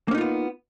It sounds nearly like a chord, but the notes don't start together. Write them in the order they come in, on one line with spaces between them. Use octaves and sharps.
A#3 C#4 D#4 F4 B3